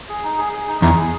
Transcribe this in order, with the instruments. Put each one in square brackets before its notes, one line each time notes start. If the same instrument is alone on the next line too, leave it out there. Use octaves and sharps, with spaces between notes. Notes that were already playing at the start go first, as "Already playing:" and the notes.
[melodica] G#4
D#4
G#4
G#4
D#4
[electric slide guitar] E2 [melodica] D#4
[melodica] G#4